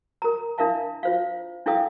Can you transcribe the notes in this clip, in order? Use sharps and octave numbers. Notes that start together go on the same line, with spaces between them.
A#4 A#5
D4 E4 A#4 E5 F5 A5
F4 C5 F5
D4 E4 A4 F5 G5 D#6